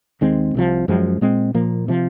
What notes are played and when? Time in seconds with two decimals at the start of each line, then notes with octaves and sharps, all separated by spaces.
0.21 D#2 D#3 G#3 C4
0.54 C2 C3 F3
0.88 F#2 F3 G#3
1.21 A#2 G#3 C4
1.54 A#2 F3 A#3
1.88 C3 F3